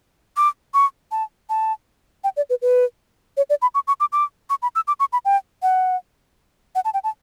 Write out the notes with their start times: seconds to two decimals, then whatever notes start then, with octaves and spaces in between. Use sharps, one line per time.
0.37 D6
0.74 C#6
1.11 A5
1.50 A5
2.24 G5
2.37 D5
2.50 B4
2.62 B4
3.37 C#5
3.50 D5
3.62 B5
3.75 C#6
3.88 C#6
4.00 D6
4.12 D6
4.50 C#6
4.62 B5
4.75 E6
4.88 D6
5.00 C#6
5.13 B5
5.25 G5
5.62 F#5
6.75 F#5
6.85 A5
6.94 G5
7.04 A5